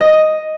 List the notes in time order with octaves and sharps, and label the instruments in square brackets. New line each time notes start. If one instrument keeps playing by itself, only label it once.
[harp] D#5